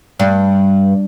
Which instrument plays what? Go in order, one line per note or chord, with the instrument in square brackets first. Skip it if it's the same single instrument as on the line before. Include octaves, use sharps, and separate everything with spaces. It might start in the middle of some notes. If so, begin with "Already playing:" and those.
[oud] G2